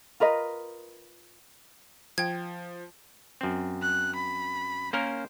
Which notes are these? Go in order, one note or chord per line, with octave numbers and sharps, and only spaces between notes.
F4 A#4 B4 D#5
F3 G5 G#6
F#2 C4
F#6
B5
A#3 C#4 A#4 C5